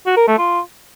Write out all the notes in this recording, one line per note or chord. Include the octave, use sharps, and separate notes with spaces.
F#4
A#4
A3
F4